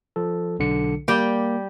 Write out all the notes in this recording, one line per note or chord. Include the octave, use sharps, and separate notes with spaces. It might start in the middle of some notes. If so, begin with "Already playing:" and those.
F3 A4
B1 D3 C#7
G3 A#3 G4